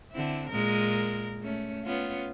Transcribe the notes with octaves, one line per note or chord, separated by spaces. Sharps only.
D3 C4 E4
A#2 G#3 A#4
A3 C#4
B3 C#4 F4